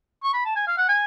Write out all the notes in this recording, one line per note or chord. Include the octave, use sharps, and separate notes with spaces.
C#6
B5
A5
G#5
F5
F#5
G#5